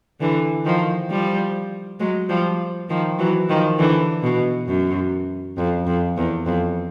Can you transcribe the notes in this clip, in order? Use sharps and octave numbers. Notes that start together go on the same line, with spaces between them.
D3 E3
D#3 F3
F3 G3
F#3 G#3
F3 G3
D#3 F3
E3 F#3
D#3 F3
D3 E3
B2
F#2
F2
F2
E2
F2